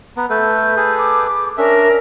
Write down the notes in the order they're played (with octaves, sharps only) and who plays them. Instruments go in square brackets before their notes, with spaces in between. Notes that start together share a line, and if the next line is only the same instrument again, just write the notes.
[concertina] B3 [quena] A#5
[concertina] A3 A4 B4 [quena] G6
[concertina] G#4 A4 B4
[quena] D6
[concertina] C#4 D4 E5 [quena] A#4